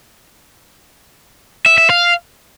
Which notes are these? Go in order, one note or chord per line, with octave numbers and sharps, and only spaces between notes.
E5
E5
F5